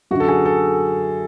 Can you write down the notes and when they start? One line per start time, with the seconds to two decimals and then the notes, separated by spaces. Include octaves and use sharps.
0.11 F#2 D3 F#4
0.20 A4
0.28 G#4
0.46 A4